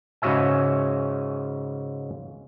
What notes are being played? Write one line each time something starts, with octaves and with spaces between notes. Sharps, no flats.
G#2 C#3 F#4 C#5 E5 G#5